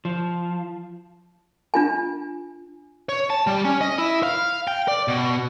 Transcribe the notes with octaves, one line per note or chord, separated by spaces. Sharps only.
F3
D4 F4 G#5
C#5
A5
G3
C#4
D#5
E4
F5
G5
D5
B2